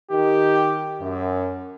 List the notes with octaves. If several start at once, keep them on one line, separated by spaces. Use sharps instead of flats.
D#3 G4
F#2